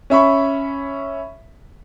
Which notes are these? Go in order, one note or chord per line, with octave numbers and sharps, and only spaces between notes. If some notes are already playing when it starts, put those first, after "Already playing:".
C#4 E5 B5 C#6